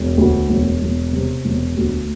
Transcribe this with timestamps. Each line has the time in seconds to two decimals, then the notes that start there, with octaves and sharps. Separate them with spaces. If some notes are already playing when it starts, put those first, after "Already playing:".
Already playing: E1
0.17 D2
0.49 E1
0.81 E1
1.13 C3
1.45 E1
1.76 D2